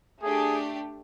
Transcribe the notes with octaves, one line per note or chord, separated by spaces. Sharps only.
A3 D4 G4 G#4